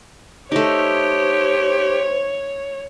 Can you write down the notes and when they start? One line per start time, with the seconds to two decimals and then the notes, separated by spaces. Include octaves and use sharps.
0.52 A3 D#4 G4 C5 C#5